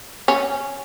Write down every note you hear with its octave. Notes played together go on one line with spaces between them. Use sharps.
C#4